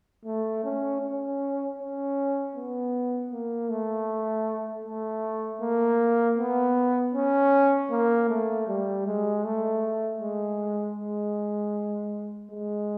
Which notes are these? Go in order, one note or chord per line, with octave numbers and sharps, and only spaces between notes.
A3
C#4
C#4
C#4
B3
A#3
A3
A3
A#3
B3
C#4
A#3
A3
G3
G#3
A3
G#3
G#3
G#3